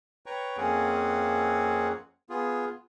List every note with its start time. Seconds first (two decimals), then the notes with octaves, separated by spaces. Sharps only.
0.26 B4 C#5 G5 A#5 C#6
0.57 F2 A#3 C4 C#4 G#4 F#5
2.30 B3 F4 G#4